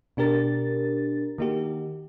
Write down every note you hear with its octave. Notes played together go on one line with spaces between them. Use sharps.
B2 D4 G4 A#4 A6
D#3 A#3 D#4 F#4 G4